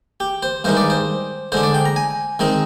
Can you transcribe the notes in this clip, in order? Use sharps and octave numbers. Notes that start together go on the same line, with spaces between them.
G4
C5
G2 D#3 G#3 D#4 C5
D5
C5
D3 G#3 D4 C5
D5
G5
A#5
G#5
D#3 G#3 C4 D#4